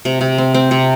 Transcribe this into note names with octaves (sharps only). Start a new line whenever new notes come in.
C3
C3
C4
C4
C3